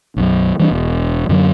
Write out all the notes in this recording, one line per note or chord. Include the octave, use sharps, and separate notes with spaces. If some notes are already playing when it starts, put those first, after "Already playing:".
B1 F#2
E3 G3 A3 D4
E1
F#2 D3 F#3